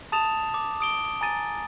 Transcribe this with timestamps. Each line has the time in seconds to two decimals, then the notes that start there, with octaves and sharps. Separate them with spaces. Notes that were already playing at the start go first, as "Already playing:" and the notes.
0.12 A5 D#6 A6 E7 F7
0.54 D6
0.81 D#6 D7 G7
1.21 G#5 A#5 A6 D#7